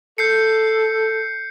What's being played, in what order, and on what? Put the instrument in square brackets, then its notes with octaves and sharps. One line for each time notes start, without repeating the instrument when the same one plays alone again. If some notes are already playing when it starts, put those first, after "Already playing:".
[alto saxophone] A4 [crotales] G6 C7 C#7